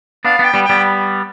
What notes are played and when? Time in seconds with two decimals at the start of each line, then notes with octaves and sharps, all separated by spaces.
0.24 B3 D4 F5
0.39 B3 D4 G5
0.54 G3 B3
0.64 G5
0.69 G3 B3